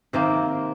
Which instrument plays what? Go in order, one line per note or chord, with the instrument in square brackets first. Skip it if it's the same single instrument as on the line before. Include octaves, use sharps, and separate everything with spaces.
[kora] C3 D#3 A#3 C4